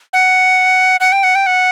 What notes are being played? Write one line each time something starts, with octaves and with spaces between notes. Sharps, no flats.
F#5
F#5
G5
F#5
G5
F#5